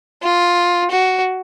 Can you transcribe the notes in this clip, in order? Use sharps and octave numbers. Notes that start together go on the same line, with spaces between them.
F4
F#4